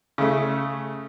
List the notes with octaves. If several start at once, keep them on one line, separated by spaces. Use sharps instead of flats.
C#3 A3